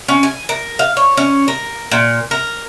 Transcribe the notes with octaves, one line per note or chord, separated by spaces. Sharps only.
C#4
G#5
A#4
F5
C#5
C#4
A#4
A#2
A#4